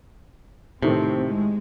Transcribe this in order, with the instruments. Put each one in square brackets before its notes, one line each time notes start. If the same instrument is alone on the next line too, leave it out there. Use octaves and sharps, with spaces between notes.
[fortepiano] A2 D#3 A4 [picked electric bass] C3 [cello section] C4
[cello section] G#3